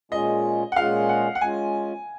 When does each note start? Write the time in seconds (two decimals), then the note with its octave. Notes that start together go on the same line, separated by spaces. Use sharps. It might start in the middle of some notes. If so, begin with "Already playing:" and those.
0.12 A#2 G#3 C#4 F4 G#4 D#5
0.72 F#5
0.76 A#2 G#3 C#4 F4 G#4 F5
1.09 F#5
1.35 F#5
1.41 G#3 C#4 F4 G#5